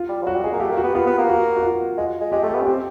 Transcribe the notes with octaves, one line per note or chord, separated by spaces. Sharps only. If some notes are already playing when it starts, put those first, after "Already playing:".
Already playing: F4
G3
F3
F#3 F#4
G3
G#3 G#4
A#3
A3 G4
A#3
F#4
B3
B3 F4
B3
A#3
F#4
F#4
F4
G#3 F4
G#3
G#3 G4
A3
G4
B3
C#4
C4 G4